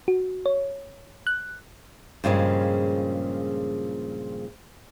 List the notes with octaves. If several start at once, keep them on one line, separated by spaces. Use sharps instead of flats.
F#4
C#5
F#6
G2 A#2 C#3 F3 G3 G#3